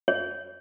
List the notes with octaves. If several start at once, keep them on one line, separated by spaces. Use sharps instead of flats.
C#5